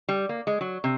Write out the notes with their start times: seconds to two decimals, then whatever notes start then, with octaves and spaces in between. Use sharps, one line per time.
0.09 G3
0.29 A#3
0.47 G#3
0.61 F#3
0.84 C3